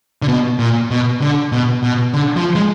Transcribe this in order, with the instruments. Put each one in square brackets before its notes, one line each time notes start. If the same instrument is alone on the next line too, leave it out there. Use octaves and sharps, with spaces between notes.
[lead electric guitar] D3
B2
A#2
B2
D3
B2
B2
D3
F3
G#3